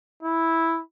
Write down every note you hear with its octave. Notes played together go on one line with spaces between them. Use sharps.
E4